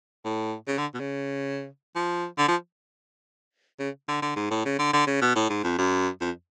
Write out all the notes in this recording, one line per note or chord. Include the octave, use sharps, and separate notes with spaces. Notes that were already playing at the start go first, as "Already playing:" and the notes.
A2
C#3
D3
B2
C#3
F3
D3
F3
C#3
D3
D3
G#2
A2
C#3
D3
D3
C#3
B2
A2
G#2
F2
F#2
F2